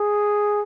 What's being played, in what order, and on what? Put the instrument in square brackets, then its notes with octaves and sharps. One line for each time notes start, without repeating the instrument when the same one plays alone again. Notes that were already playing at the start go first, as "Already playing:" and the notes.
Already playing: [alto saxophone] G#4